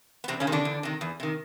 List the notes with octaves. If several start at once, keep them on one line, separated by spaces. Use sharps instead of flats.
B3
E2 C3 C4
C#3 C#4
C3 D#3
D3 D4
E2
C3 D#3
E2
C3 D#3